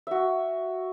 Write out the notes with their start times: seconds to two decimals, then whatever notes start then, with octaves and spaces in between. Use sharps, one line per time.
0.07 F#4 E5